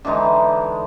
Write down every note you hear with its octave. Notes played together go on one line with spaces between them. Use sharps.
D3 E3 G#3 D#4